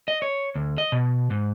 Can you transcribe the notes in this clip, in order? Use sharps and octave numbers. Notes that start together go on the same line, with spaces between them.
D#5
C#5
D2
D#5
B2
G#2